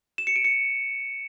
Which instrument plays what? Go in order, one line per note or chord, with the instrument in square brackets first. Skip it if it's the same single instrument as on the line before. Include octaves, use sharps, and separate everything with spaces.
[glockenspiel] E7
C#7
D7
C#7